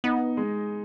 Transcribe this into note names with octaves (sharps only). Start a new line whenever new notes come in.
B3 D#4
G#3